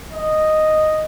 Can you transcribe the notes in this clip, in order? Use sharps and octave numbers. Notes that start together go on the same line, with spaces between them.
D#5